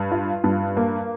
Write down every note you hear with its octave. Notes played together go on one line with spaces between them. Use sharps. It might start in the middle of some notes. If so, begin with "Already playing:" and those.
Already playing: G2
F4
G2
A#3